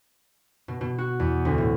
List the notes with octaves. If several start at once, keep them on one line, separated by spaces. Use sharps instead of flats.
B2
B2
F#4
E2
D2
A2